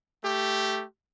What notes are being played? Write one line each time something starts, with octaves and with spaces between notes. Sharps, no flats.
A3 G4